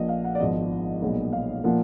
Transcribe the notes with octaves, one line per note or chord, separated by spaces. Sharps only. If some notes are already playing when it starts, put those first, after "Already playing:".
Already playing: A#1 A#2 F3 D#5 F#5
F5
F#5
D5
G#1 G#2 F3 B3 D#5
B1 A#2 G#3 B3
F5
A#2 F3 A#3 F#5